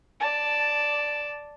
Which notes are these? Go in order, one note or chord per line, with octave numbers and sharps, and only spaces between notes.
D5 A5